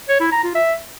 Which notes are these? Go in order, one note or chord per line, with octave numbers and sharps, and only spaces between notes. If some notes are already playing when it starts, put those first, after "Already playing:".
C#5
E4
A#5
F4
E5